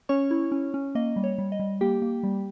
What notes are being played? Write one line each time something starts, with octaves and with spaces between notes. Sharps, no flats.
C#4 C#5 C#6
E4
C#4
C#4
A#3 D#5
G3
C#5
G3
D#5
G3
A#3 G4 G5
A#3
G3